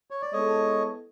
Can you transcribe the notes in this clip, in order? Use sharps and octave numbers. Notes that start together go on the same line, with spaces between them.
C#5
D5
G#3 B3 E4 A4 C#5 D#5